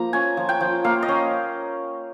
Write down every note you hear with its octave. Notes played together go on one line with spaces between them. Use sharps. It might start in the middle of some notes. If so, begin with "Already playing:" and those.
Already playing: F3 A#3 A#5
C#4 G#5
F3
G5
F3
A#3 F5
D#5
C#4